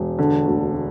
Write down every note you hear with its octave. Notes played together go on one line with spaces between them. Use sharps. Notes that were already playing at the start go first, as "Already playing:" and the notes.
Already playing: E1
D3
D2
A3